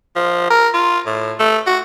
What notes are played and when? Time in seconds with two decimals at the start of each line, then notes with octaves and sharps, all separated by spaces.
0.16 F3
0.50 A#4
0.74 F4
1.06 A2
1.39 A3
1.67 F#4